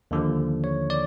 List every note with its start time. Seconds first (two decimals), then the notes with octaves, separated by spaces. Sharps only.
0.11 D#2 D3 F3
0.64 C#5
0.90 D5